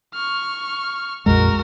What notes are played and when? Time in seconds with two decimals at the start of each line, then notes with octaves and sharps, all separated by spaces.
0.14 C#6 F6
1.26 A#1 F2 G#3 F#4 A#4